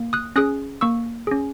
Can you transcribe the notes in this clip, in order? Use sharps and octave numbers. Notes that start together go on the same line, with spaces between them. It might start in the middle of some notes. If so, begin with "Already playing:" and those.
Already playing: A#3
D#6 F#6
C#4 G#4 D#6 F#6
A#3 C#6 E6
C#4 G#4